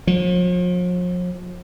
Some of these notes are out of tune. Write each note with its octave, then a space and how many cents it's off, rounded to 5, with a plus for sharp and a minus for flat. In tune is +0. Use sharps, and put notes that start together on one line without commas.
F3 +45